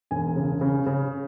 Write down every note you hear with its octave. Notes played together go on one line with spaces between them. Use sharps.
E1 G#5
C#3
C#3
C#3